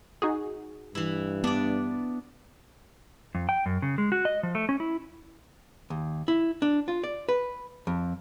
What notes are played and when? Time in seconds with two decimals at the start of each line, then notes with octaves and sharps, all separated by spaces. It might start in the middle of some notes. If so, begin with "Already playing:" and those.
0.22 D#4 F#4 G#4
0.95 G2 E3 E4
1.44 B3 D4 D5
3.35 F2
3.49 G5
3.66 F#2
3.82 C#3
3.98 G#3
4.12 F#4
4.25 D#5
4.43 F3
4.55 A3
4.69 C#4
4.80 E4
5.90 D#2
6.28 E4
6.62 D4
6.88 F4
7.04 D5
7.29 B4
7.87 F2